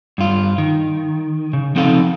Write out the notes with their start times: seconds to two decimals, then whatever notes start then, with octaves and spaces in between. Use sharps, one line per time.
0.18 G2 F4
0.58 D#3
1.53 C#3
1.75 F3 C4 D#4 A4 F5